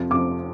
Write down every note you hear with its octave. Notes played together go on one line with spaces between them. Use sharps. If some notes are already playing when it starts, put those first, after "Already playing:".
Already playing: F2 C3 F3
F2 C3 F3 D6